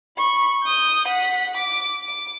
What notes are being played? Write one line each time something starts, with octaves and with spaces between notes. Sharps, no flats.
B5 C#6
D#6 G6
F#5 B6
D6
D6